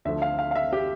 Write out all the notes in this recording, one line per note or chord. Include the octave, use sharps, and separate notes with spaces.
D2 D3 F3 A3 E5
F5
F5
F5
E5
G4